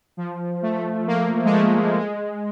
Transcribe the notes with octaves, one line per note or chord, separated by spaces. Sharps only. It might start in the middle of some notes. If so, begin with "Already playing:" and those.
F3
A3
A#3
G#3
A3
G#3